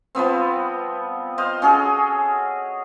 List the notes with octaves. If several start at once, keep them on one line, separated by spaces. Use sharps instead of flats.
F3 G3 B3 C4
C5 D#5 F5
C#4 F#4 G#4 A4